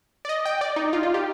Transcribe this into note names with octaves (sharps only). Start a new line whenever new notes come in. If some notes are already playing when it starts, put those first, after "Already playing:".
D5
D#5
G5
D5
D#4
F4
F4
G4